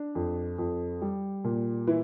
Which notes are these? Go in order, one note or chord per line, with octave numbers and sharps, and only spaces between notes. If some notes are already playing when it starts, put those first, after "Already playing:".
Already playing: D4
F2
F2
G3
A#2
E3 E4